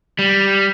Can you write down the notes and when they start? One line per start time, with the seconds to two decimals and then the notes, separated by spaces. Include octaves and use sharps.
0.19 G3